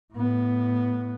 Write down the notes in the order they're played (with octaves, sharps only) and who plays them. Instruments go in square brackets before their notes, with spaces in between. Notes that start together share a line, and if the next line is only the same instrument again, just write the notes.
[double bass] A2 B3